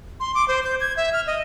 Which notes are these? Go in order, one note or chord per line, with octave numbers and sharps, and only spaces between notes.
C6
D6
C5
G6
G#6
E5
F6
D#5